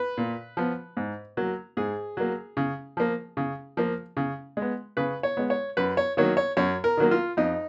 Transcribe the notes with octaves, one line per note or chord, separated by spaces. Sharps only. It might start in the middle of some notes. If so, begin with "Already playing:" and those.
Already playing: B4
A#2
F3 B3
G#2
F#3 A#3
G#2 G#4
F#3 A#3
C#3
F3 A#3
C#3
F3 A#3
C#3
G#3
B3
C#3 B4
C#5
G#3 B3
C#5
F#2 B4
C#5
D#3 F#3 A#3 C#5
C#5
F#2 C#5
A#4
D#3 F#3 A#3
F4
F2 D#4